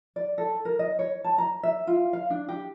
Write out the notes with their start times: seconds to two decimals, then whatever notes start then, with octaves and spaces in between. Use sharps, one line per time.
0.16 D5
0.38 A4
0.65 A#4
0.79 D#5
0.99 C#5
1.24 A5
1.38 A#5
1.63 E5
1.87 F4
2.13 F5
2.30 D4
2.49 G4